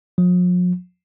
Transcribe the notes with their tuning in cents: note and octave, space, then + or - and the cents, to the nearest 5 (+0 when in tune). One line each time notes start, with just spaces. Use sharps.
F3 +45